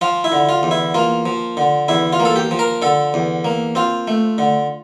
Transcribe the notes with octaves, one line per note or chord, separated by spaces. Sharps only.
F3 F4
E4
D3
F4
E2
E4
A#3 F4
F3
D3
E2 E4
F4
A#3
A4
G4
F3
A#4
D3 A4
E2
A#3
C4 F4
A3
D3